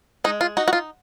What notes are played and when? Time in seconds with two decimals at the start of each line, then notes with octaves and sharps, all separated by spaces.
0.24 G#3 D#4
0.41 F4
0.57 D#4 F#4
0.68 F#4
0.73 F4